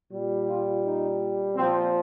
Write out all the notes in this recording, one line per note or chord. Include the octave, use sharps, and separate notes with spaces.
A#2 G3
F4
D#4
A#2 F3 C4